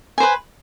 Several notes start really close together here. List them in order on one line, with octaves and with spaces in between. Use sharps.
G#5 C5 B4